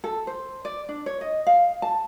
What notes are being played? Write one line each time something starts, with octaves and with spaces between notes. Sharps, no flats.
A4
C5
D5
D4
C#5
D#5
F5
A5